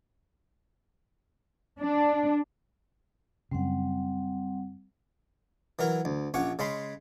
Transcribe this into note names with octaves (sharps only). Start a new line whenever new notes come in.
D4
F#2 C#3 G3 C4 F#5
E3 F#3 A#4
D2
A#1 C#4 C#5 F#5 D6
C#3 G#3 C#4 B5 C6